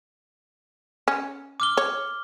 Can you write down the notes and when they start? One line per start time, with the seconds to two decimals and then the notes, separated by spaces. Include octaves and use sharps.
1.08 C#4
1.60 D6 F6 G7
1.77 C#5